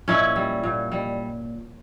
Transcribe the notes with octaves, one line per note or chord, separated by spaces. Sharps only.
A#2 C#4 E4
G3
A#2
G3